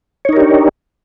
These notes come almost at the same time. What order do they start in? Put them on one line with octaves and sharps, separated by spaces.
C#5 D#4 A#4 G4 D4